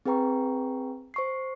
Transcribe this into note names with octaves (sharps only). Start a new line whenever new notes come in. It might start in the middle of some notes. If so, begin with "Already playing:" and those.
C4 G#4 B4 G5 A#5 C#6
C5 C#6 C7